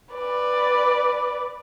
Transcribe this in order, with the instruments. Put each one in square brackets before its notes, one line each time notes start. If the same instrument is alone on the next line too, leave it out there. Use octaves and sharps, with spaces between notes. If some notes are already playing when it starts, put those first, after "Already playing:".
[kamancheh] B4 D5